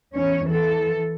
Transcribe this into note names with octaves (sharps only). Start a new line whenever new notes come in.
E2 C#4 C#5
E3 A4